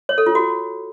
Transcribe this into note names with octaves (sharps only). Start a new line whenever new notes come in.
C#5
A4
F4
F#4